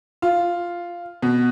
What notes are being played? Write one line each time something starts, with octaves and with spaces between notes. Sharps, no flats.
F4
B2